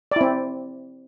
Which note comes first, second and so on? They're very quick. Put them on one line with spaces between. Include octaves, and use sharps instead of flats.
D5 E4 C4